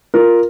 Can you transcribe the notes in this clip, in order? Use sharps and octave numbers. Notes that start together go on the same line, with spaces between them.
F4 A#4